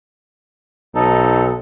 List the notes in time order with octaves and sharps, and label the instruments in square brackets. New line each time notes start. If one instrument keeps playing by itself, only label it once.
[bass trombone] B1 [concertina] D#4 A4